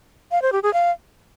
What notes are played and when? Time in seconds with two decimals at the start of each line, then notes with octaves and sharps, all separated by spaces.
0.31 F5
0.42 C5
0.52 G4
0.63 G#4
0.74 F5